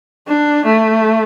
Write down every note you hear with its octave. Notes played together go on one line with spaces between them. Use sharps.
D4
A3